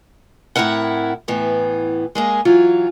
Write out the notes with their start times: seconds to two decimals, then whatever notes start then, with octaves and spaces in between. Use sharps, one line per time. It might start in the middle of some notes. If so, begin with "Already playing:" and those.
0.56 A2 C4 D4 E4 A#4 F#5
1.28 A2 E3 B3
2.15 G#3 A#3 G#4
2.45 E3 F#3 F4